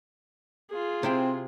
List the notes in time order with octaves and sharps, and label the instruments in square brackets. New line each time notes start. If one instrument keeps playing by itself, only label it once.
[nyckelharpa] F4 G#4
[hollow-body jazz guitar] C3 E4 G5 [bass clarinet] C4